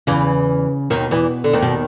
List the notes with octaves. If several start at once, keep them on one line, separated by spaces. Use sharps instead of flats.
E2 C#3 E3
D#2 B2 D#3
E2 E3
D3
D#2 D#3
B2